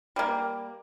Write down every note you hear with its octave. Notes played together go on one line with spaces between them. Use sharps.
G3 A#3